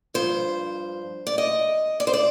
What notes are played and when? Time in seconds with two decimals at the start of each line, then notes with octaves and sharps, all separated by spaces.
0.14 G2 F3 C5
1.27 D5
1.38 D#5
2.00 D5
2.07 C5
2.13 D5